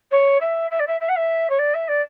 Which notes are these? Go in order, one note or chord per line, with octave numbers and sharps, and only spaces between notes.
C#5
E5
E5
D5
E5
E5
F#5
E5
C#5
D5
E5
D5